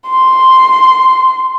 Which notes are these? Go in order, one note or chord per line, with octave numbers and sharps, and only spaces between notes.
C6